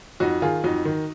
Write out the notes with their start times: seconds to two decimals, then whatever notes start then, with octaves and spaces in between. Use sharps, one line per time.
0.20 F2 D#4 F#4
0.42 D#3 F4 G#4
0.64 F2 D#4 F#4
0.85 D#3